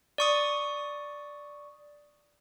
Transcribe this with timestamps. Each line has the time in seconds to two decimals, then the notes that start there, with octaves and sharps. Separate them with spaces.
0.18 D5 C#6 D#6